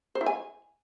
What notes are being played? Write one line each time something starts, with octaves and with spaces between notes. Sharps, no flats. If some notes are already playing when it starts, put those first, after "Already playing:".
C5
E4
G#5